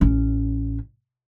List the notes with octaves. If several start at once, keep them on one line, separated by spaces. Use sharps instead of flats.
A1 C#4